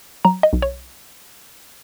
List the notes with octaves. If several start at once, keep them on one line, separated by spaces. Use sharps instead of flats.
F#3 A#5
D#5
B1
C#5